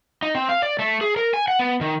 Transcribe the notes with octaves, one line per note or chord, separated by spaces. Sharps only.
D#4
C4
F5
D5
A3
G#4
A#4
G#5
F#5
B3
D#3